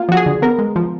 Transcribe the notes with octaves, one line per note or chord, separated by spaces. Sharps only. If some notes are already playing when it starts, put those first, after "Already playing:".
Already playing: A#3 F4
F3 F#4
G#4
D3
B3 A#4
G#3
F3